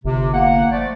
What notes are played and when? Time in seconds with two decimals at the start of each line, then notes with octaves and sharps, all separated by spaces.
0.05 G1 C3
0.34 A#3 F#5
0.72 F3 A3 D5